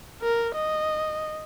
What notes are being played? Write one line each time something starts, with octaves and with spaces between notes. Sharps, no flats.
A#4
D#5